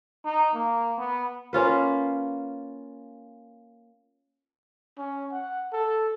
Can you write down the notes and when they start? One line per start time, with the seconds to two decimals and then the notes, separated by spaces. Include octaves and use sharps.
0.25 D#4
0.54 A#3
0.98 B3
1.53 A#3 C#4 F4 B4
4.98 C#4
5.32 F#5
5.73 A4